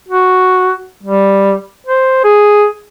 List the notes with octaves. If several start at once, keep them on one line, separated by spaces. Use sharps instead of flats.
F#4
G3
C5
G#4